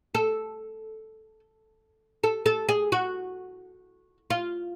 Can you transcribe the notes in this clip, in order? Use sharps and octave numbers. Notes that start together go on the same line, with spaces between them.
A4
A4
A4
G#4
F#4
F4